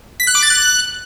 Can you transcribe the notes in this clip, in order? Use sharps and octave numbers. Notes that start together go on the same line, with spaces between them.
B6
F#6
D6
A6
F#6